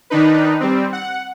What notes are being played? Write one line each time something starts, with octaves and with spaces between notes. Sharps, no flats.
D#3 D4 D#4 B4
G3 C4
F#5